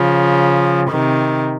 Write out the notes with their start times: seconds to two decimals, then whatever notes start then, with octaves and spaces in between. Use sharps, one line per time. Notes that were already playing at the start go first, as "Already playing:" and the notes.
Already playing: C#3 F3
0.90 C3 D#3